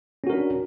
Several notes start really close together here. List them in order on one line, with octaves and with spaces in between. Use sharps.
C#4 F#4 A#4 D4